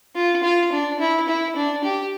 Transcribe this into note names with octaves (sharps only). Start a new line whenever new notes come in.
F4
F4
D4
E4
E4
D4
G4